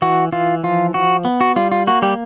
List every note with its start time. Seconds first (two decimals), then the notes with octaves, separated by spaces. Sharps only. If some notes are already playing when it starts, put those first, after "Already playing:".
0.02 E3 F#4
0.32 E3 F4
0.63 F3 F4
0.94 F3 F#4
1.25 B3
1.41 F#4
1.56 G3 F4
1.72 F4
1.87 A#3 F#4
2.02 G3 G4